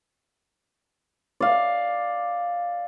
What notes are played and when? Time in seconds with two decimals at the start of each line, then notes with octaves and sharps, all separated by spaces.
1.40 D5 F5